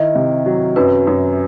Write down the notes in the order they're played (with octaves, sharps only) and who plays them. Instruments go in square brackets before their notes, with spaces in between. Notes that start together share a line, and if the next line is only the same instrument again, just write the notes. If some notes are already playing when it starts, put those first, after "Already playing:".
Already playing: [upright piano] D#3 E4 [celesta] D#5
[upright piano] C3
F#3
[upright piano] F#2 [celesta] B4
[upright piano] F#2